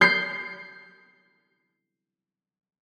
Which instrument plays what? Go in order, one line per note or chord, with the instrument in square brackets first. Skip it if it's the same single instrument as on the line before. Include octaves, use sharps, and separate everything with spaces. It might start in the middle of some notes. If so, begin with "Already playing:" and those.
[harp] G6 C7